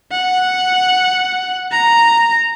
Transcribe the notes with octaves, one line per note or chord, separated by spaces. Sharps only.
F#5
A#5